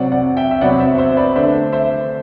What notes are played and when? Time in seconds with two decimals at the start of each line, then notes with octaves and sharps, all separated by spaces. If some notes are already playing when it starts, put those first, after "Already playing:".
Already playing: C3 F#3 C4 D5 F#5
0.12 D5 F#5
0.37 E5 G5
0.51 E5
0.61 C3 F#3 B3 D5 F#5
0.79 C5 E5
0.98 C5 E5
1.17 B4 D5
1.36 D3 A3 D4 C5 E5
1.72 C5 E5